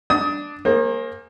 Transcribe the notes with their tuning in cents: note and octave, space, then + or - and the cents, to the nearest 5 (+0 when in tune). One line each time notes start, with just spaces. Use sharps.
D4 +0 D#6 +30
A#3 +0 G#4 +0 C5 +40